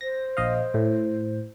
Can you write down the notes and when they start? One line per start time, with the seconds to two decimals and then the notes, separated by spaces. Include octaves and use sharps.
0.01 C5 A#6
0.37 A#1 D#5 F5
0.74 A2